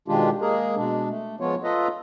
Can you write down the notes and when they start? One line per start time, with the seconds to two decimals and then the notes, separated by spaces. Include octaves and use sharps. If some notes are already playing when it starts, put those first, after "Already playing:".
0.08 B2 D#3 G#3 D4 F4 G4
0.41 G#3 A#3 G#4 A#4
0.76 B2 G#3 D4
1.09 A3
1.40 F3 G#3 B3 F4 C#5
1.63 F4 A4 B4 D#5 E5 A#5